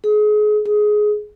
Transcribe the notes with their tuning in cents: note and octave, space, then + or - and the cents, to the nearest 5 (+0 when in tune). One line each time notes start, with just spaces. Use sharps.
G#4 +30
G#4 +15